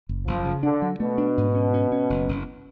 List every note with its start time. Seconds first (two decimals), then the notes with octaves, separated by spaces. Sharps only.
0.09 F#1
0.27 F#1 F3
0.45 C#3
0.63 D3 D4
0.82 F#3
1.00 B2 A3
1.18 D4
1.37 G#2
1.55 C#4
1.74 C#4
1.92 C#4
2.10 F#1
2.29 F#1